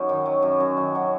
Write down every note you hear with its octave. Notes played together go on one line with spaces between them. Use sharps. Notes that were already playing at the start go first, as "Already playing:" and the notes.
Already playing: F#2 F#3 C#4 D#4
D#3
F#3
F#2
F#2
D#3
F#3